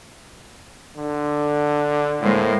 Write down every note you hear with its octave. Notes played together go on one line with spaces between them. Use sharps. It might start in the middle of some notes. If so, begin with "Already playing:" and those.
D3
A2 G#3 A#3 C5